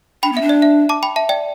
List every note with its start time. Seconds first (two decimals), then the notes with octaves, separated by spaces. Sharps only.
0.23 D4 G5 B5
0.32 B3
0.37 D4 E5
0.49 D5
0.62 E5
0.89 A5 D6
1.03 G5 B5
1.16 E5 A5
1.29 D5 G5